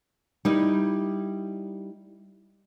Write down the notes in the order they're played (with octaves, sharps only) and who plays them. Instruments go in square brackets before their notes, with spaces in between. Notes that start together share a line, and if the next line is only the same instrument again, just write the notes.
[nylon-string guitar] G3 D#4 E4